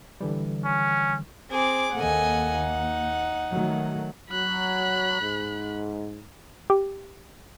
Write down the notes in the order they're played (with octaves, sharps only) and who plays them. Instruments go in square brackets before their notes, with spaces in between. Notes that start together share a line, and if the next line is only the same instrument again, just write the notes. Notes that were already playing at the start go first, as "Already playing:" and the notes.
[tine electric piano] D3 E3 G3
[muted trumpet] C#4
[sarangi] C4 [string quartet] G#4 D6
[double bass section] D#2 A#3 [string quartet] A4 D#5 G#5 [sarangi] F#5
[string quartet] D#4
[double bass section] D#3 F#3 A3
[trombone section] F#3 [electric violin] B5 F#6
[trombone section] G#2
[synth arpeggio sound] G4